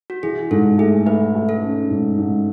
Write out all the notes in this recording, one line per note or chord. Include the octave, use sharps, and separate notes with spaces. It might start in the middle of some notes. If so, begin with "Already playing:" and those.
F#4
E3 G#4
G#2 A4
A3 G#4
A3 B4
A3
A4
C#4
G#2
G#2